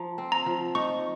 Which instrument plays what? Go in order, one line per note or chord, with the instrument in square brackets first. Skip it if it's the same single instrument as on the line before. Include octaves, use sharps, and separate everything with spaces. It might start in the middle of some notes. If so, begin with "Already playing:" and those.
Already playing: [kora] F3 [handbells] A#5
[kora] C4
[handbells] A#5
[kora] F3
[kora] D#4 [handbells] C#6